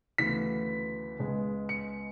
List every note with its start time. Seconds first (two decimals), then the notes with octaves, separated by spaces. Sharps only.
0.18 D2 C#3 E3 B3 B6
1.19 C#2 C#3 G#3 B3
1.69 C#7